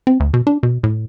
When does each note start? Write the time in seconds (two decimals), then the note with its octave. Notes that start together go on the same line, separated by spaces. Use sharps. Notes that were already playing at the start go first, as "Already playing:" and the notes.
0.07 C4
0.20 D2
0.34 B2
0.47 D4
0.63 B2
0.83 A2